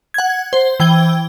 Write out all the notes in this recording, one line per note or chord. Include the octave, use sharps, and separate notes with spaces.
F#5 G#6
C5
E3 G5 G#6 G7